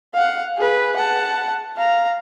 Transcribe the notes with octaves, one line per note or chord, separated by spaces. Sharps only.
F5 F#5
G#4 B4
F#5 A5
F5 A#5